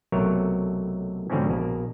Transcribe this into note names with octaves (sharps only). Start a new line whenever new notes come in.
B1 C3 F#3 A3 A#4 C#5
G#2 B2 D3 F3 C4 C#4
A#1 B2 A#3